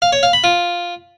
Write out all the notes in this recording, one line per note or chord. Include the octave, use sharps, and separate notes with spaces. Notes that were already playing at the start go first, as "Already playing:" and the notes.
F5
C#5
F5
B5
F4